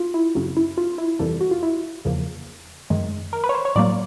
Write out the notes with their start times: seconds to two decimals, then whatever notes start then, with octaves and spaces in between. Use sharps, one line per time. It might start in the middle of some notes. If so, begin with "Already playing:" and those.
Already playing: F4
0.14 E4
0.35 F#2 C#3 F#3
0.57 E4
0.78 F4
0.98 E4
1.19 F2 C3 E3 G3 A#3 A4
1.41 F#4
1.51 F4
1.63 E4
2.05 E2 C#3 F3 A#3
2.90 F#2 D#3 G#3
3.33 A#4
3.44 B4
3.49 C#5
3.54 C5
3.65 C#5
3.76 A2 F#3 A#3 D5